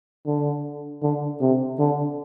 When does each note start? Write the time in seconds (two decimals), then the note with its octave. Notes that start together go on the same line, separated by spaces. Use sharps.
0.26 D3
1.02 D3
1.41 C3
1.79 D3